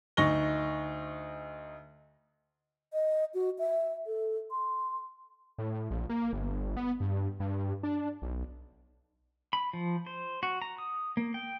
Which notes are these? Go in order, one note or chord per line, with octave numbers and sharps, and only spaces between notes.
D2 D#4 C#6 A#6 G7
D#5
F#4
E5
A4
C6
A2
A#1
A#3
G1
B3
G2
G2
D4
B1
B5
F3
C5
F#4
A#5
D#6
A#3
G5